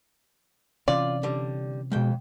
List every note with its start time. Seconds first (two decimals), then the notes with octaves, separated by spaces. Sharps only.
0.88 C3 E3 C#4 F4 D5
1.23 D3 G3
1.92 F2 B2 G#3 G5